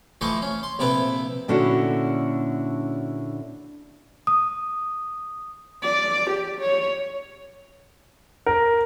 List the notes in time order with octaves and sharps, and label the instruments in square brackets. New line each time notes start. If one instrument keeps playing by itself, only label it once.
[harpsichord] E3 F3 A3 C5 D#5 C#6
C#4
C6
A#1 C3 E4 A4 B4
[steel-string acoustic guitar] A#2 D3 C#4 D4 E4 F#4
[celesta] D#6
[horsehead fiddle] D5
G4
C#5
[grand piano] A#4